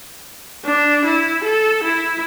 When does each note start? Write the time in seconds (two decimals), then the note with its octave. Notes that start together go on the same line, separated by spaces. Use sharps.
0.65 D4
1.05 E4
1.44 A4
1.84 E4